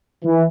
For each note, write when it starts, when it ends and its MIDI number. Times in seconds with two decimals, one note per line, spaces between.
0.24 0.44 52